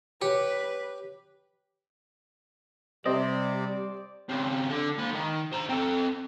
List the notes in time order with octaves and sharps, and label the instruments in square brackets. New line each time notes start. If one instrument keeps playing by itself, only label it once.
[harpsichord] G4 [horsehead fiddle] B4 [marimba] C#5
[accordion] C3 [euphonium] G3 [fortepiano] C4 D#5 [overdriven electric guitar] D5
[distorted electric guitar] C#3 C4
D3
A#3 B5
D#2 D#3
C5 A#5
C4 A4